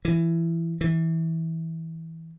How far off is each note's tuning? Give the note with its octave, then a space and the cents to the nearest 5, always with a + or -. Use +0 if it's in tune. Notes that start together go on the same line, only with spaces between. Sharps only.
E3 +15
E3 -20